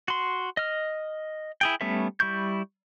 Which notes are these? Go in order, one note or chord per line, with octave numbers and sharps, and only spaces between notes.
F#4 C6
D#5 F6
E4 G#4 G5
G3 A3 B3 C#4 E5
G3 E4 C#6 G6